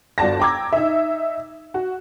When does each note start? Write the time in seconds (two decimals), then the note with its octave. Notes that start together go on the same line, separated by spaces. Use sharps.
0.18 G1 F#4 D5 A5 A#6
0.40 G5 A#5 D6 E6 G#6
0.73 D#4 E5
1.74 F#4